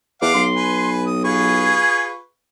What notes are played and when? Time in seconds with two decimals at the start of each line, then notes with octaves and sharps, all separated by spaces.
0.22 E2 F5 F#5 D6
0.35 B1 C6
0.56 B4 G#5
1.07 D#6
1.24 F4 G#4 B4 C#6